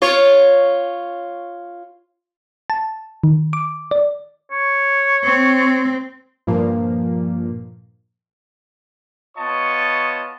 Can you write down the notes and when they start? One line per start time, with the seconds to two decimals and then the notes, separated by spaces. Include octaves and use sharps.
0.02 F4 C#5
2.70 A5
3.24 D#3
3.53 D6
3.91 D5
4.52 C#5
5.25 C4
6.47 G2 A#2 F3 A#3
9.37 B3 F4 C#5 D#5 A5 C#6